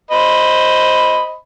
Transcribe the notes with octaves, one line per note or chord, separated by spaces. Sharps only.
C5 D#5 B5